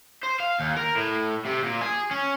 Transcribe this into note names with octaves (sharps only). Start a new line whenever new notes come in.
C5
F5
D#2
A#4
A2
C3
A#2
G#4
C#4